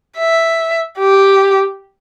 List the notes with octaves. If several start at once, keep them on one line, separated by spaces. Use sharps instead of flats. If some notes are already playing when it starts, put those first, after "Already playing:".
E5
G4